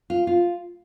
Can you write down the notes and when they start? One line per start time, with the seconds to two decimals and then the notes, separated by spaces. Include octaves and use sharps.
0.10 F4
0.27 F4